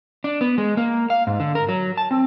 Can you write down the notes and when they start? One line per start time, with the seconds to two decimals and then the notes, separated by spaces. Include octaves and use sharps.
0.24 D4
0.41 B3
0.58 G#3
0.77 A#3
1.10 F5
1.27 G#2
1.40 D3
1.55 A#4
1.69 F#3
1.97 A5
2.11 C4